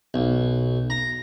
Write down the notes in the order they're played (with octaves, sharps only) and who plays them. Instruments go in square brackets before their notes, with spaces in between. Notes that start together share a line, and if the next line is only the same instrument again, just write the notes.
[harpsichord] B1
A#5